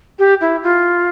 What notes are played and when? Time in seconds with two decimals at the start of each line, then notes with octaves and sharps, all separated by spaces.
0.19 G4
0.41 E4
0.63 F4